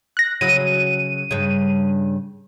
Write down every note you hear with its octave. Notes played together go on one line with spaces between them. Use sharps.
F#6 A#6
C#3 F#3 E4 D#7
G2 C#3